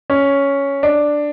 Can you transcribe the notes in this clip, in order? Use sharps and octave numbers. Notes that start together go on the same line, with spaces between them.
C#4
D4